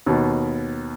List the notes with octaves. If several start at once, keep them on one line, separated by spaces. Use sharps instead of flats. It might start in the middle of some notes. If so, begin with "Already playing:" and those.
D#2 B2